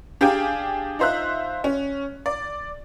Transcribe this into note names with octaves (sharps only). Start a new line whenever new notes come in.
D4 G4 G#4 F5 G5 G#5
D#4 F4 C5 E5 F#6
C#4
D5